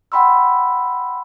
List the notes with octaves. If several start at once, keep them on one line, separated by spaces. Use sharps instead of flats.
F#5 G5 B5 C6 E6